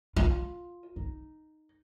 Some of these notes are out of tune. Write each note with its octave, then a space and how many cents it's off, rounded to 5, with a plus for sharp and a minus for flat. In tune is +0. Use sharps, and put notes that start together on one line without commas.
F4 +10
D#4 -5